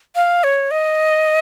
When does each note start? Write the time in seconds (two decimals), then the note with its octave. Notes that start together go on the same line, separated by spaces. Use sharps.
0.16 F5
0.44 C#5
0.71 D#5